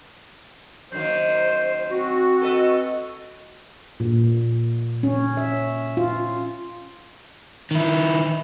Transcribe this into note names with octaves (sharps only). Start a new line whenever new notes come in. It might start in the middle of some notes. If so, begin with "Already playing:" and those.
F#2 D#3 A#3 C5
C4 F#4
A4 B4 D#5
A#2
C#4
E5
F4
D#3 E4